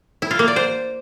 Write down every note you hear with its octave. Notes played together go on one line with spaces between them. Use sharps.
E4
F4
A#3
D5
C5